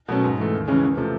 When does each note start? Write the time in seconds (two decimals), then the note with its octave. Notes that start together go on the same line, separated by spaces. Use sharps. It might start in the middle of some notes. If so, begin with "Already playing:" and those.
0.08 B2 F#3 A3 C#4
0.24 G#2
0.38 E3 A3
0.54 D#2
0.68 C#3 E3 G#3 C#4
0.83 E2
0.97 C3 F3 A3